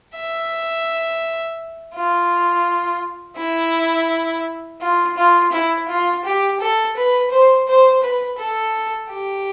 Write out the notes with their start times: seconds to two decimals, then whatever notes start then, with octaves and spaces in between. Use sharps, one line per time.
0.15 E5
1.94 F4
3.37 E4
4.81 F4
5.17 F4
5.52 E4
5.88 F4
6.25 G4
6.60 A4
6.96 B4
7.31 C5
7.68 C5
8.03 B4
8.38 A4
9.11 G4